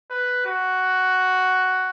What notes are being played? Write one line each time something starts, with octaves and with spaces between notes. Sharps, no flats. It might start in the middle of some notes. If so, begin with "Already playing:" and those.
B4
F#4